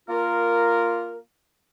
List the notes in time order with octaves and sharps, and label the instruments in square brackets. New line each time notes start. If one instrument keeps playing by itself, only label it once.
[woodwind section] A#3 F4 A#4